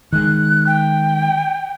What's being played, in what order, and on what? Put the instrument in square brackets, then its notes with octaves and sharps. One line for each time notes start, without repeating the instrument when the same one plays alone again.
[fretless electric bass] D#3 G#3 [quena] F#6
[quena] G5